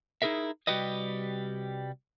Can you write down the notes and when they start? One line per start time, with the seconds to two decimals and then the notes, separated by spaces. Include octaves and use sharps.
0.22 D#4 E4 G#4 A#4 E5
0.67 C2 G3 F#4 G4 B4 D#5